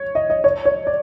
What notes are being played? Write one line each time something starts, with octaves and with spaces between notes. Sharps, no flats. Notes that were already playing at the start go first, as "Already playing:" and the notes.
Already playing: C#5
D#5
D#5
C#5
C#5
D5